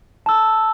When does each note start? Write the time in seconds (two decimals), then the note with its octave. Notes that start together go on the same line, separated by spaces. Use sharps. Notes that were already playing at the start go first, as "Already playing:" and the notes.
0.26 A5 E6